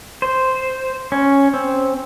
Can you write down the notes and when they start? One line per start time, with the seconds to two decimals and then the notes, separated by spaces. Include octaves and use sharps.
0.22 C5
1.12 C#4
1.54 C4